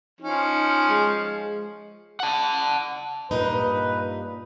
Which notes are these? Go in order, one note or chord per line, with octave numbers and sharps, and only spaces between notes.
F3 C#4 D#4
G#3
F#5 A5
G2 A#2 D#4 B4